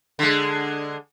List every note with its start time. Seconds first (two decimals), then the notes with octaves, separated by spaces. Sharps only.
0.19 D3 G#3